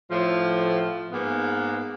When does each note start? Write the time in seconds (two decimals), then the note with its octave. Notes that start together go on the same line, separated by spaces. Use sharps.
0.11 A2 F3
1.12 G#2 A#3 B3